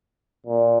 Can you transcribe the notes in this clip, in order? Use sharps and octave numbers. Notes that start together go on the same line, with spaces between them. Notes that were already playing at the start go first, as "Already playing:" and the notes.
A#2